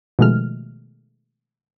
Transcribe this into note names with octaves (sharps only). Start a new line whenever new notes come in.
B2 D#3 F3 G#3 A3 F6